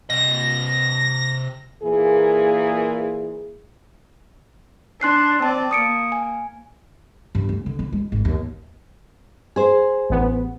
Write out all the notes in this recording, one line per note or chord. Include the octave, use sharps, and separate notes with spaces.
C3 D#5 A#6
A#2 E3 A#3 G#4
D4 C6 F#6 C7
C4 D5 A5
A#3 D#6 C#7 D7
G#5
G2
D2
D3
E4
G#3
G#1
D#2
G#4 C5
A1 B3